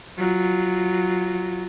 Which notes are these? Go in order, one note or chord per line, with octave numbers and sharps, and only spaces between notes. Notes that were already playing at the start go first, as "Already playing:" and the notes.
F#3 F4